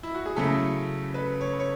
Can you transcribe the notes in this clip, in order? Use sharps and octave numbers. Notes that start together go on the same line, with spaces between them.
E4
F#4
G#4
C#3 F#3 A3 E4 A4
B4
C#5
C#5